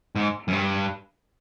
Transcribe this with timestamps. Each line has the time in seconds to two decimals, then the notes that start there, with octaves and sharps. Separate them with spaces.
0.16 G#2
0.48 F#2
0.53 G2